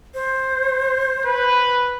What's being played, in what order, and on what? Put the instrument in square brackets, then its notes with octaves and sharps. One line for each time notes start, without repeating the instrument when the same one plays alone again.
[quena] C5
[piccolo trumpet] B4